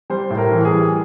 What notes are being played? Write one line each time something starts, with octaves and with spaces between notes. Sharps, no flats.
G3 C5
A2
A#4
E3
G#4
G3